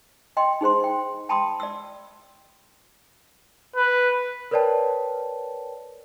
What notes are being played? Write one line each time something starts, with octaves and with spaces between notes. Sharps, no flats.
D#5 G5 C6
D#4 G#4 C5 C6
G5
G5 A5 B5 C6 D#6
D5 E6
B4
A#4 B4 C#5 D5 G5 A5